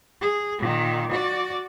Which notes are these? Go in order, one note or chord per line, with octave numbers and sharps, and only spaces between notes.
G#4
A#2 D#3
F#4 D5